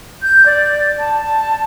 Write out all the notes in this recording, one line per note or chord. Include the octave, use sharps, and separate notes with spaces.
G6
D5
A5
A5